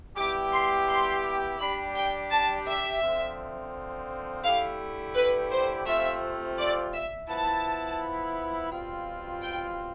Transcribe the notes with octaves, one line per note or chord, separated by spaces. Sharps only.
G3 B3 E4 G4 D6
C6
C6
G3 D4 G4 B5
G5
A5
E5
D3 F3 C4
D3 A3 E4 G4 F5
B4
C5
C3 F3 A3 C4 F4 E5
D5
E5
F3 B3 E4 A5
B2 G3 C4 F4
G5